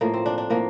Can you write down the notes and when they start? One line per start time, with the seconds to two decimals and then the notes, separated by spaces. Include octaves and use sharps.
0.01 A2 F3 A#3
0.14 C4
0.26 D4
0.38 D4
0.50 A2 F3 A#3